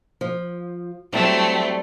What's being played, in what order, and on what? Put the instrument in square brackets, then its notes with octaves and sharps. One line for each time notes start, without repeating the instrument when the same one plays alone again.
[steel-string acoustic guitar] F3
[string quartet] F#3 A3 C4 [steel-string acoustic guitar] G3 E4 D5